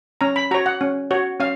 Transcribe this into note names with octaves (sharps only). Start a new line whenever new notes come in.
C#4 A#5
B5
F#4 C#5 A#5
F#5
C#4
F#4 C#5
C#4 F5